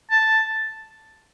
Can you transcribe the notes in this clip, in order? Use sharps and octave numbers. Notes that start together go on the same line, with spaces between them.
A5